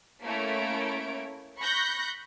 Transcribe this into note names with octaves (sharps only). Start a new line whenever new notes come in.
A3 A#3 C#4 E4 C#5 D7
B5 C#6 F#6 G6 A#6